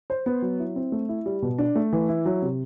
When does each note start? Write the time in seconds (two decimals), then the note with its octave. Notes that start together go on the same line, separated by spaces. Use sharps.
0.10 C5
0.26 B3
0.42 F#3
0.59 E4
0.76 C4
0.92 A3
1.09 E4
1.26 G3
1.42 B2
1.58 D4
1.75 A3
1.92 E3
2.09 E4
2.26 F#3
2.42 C3